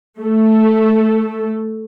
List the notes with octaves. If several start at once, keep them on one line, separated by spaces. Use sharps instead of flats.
A3 A4